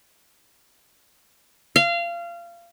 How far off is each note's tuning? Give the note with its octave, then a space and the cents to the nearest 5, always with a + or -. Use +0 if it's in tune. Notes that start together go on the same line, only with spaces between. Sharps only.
F5 -25